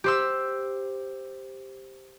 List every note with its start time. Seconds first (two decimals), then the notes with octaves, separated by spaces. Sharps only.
0.04 G4 C5 E6